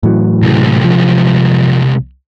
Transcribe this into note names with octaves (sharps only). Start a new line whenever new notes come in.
A2 E3 F#3
C2 G#3
F3